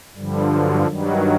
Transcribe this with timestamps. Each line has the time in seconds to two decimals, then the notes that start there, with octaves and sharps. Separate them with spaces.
0.15 G2 D3 F3 G3
0.52 F#3
0.87 G2 D#3 F#3 G3